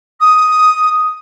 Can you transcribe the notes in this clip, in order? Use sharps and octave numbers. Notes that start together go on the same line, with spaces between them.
D#6